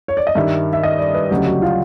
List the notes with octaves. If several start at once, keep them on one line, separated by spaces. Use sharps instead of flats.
C#5
D5
D#5
G2 D#3 G3 E5
E5
D#5
D5
B4
D2 C#3 F#3 G4
F#4
F4